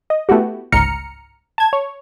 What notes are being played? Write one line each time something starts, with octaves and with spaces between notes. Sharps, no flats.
D#5
A3 B3 E4 F#4 G4
G1 C#2 G#2 A#5 F6 C#7
A5 G#6
C#5